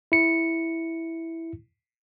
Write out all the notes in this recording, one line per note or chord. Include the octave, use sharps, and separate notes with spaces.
E4 C#7